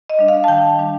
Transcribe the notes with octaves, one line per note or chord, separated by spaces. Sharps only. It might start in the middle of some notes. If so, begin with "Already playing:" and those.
D#5
G3 D4
F5
A5
D#3 G5
G3 D4